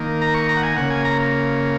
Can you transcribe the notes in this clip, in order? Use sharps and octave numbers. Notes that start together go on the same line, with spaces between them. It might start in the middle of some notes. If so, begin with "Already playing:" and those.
Already playing: D#3 A#3
A#5
C#6
A#5
F#5
G#5
C#3 A#3 F#5
G#5
A#5